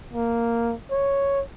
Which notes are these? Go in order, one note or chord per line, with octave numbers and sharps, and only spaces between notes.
A#3
C#5